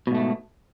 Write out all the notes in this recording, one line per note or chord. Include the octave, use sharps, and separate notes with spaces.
G#2 B2 A3